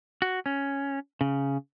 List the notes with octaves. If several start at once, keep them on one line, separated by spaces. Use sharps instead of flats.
F#4
C#4
C#3